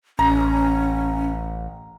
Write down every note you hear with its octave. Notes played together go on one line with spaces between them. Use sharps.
A1 C#4 A#5